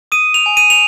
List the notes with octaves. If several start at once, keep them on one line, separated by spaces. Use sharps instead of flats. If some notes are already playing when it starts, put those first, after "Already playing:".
D#6 D#7
F7
G#5
D#7
F7